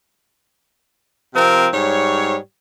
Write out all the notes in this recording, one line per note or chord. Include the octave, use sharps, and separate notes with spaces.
C3 F3 C4 A#4
G#2 G3 C#5